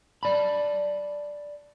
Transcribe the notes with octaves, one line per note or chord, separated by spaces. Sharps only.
D5 A5 B5